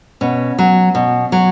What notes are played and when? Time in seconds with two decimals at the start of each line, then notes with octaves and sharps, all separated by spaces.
0.21 B2 C#4
0.58 F#3
0.95 B2
1.32 F#3